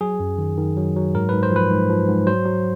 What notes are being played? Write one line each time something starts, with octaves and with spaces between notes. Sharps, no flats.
F#3 G#4
F#2
D#3
D#3
F#3
F#3
G#2 A#4
G#2 B4
C5
F3 B4
G#2
F3
G#2
F#3 C5
F#3